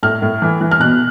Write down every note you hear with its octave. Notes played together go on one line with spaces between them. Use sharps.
A2 F6
A2
E3
E3
F6
B2 F#6